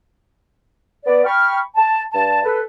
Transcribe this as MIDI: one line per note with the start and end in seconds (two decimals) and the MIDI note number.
1.06 1.22 59
1.06 1.22 74
1.25 1.59 79
1.25 1.59 83
1.25 1.59 85
1.25 1.59 89
1.76 2.01 81
2.13 2.44 43
2.13 2.44 81
2.45 2.61 69
2.45 2.61 71